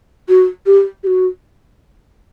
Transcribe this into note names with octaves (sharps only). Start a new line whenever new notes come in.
F#4
G4
G4
F#4